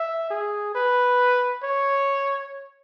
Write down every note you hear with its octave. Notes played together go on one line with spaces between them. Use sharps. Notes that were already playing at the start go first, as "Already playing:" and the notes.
Already playing: E5
G#4
B4
C#5